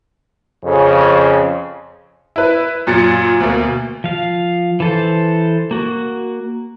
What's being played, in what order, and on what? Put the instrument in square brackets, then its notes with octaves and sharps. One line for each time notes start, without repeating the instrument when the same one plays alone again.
[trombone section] F2 C#3
[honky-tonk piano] E4 B4
F#2 A#2 A6 C#7
D2 B2 A#3
[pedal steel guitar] F3 F5
E3 A4 C5
A#3 F#4